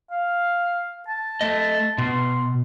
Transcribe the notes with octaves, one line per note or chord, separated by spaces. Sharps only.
F5
A5
A3 D#5
B2 C6